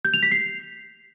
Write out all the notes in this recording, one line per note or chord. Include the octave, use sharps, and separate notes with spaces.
G6
F7
B6
C7